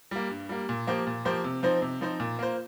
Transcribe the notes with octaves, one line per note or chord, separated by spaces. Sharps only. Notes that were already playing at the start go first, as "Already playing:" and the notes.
G3 A#3
G2
G3 A#3
A#2
F3 A#3 G4 C5
A#2
F3 A#3 G4 C5
C3
F3 C4 D#4 C5
C3
F3 C4 D#4 C5
A#2
A#3 F4 C5